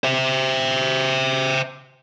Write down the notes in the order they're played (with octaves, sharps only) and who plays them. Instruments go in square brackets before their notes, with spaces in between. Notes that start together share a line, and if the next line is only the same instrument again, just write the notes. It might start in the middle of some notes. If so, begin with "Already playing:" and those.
[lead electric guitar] C5 E5